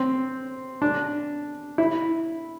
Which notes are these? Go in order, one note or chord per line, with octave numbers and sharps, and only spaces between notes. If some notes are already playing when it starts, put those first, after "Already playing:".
Already playing: C4
D4
E4